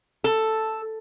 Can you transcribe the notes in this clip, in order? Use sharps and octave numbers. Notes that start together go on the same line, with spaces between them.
A4